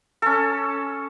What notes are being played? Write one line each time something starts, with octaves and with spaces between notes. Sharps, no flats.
C#4 A4